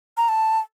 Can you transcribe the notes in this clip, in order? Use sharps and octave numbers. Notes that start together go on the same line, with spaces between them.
A#5
A5